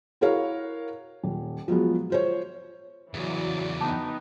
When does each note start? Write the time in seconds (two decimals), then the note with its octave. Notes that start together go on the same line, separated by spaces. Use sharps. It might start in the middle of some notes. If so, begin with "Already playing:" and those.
0.21 E4 F#4 A#4 C#5 F5
1.23 D#1
1.68 F3 F#3 G#3 B3
2.10 F4 C5 C#5
3.14 E2 C#3 E3 F#3 D5
3.81 B3 D#4 G5 A5 D6